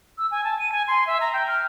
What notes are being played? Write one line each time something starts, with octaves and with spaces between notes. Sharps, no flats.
E6
G#5
A5
D#7
G#5
C6
E5
A#5
G5
F6